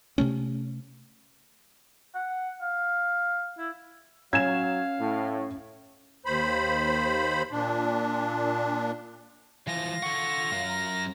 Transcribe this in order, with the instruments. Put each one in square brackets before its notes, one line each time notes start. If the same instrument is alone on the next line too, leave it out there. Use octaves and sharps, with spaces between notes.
[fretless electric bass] C3 A3 C#4
[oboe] F#5
F5
E4
[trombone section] F#3 [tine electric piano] C#4 [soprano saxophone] F5 [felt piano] G#6 E7
[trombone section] A2
[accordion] D#2 C5 B5
A#2 D4
[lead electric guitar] E3 F3 [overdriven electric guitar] F4 [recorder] A#6
[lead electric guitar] A4 F#5 [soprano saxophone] C#6
[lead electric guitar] F#2 A#4 [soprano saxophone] F5
[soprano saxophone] A#5